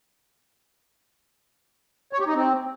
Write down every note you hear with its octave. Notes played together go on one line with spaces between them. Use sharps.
C#5
G4
D#4
C4